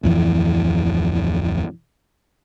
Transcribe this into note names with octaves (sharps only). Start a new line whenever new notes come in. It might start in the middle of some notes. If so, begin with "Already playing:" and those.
D1 F2 E3